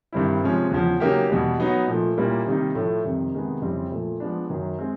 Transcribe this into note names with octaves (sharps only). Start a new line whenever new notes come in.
G2 D#3 G3 C4 E4
C3 F3 G#3 C#4
E2 C#3 F3
C#3 F#3 A#3 D#4 G4
E2 B2 G3
F#3 B3 D#4 F#4
A#2 F3 A3
A#2 G3 A#3 C#4 E4
C3 D#3 G3 A#3 D#4
A2 F3 A3
F2 C3 D#3 G3
C3 D#3 G#3 B3
F2 C#3 E3 G3 C4
A#2 F3 A3
F3 G#3 B3 D4
F#2 D#3 F#3
G#3 C4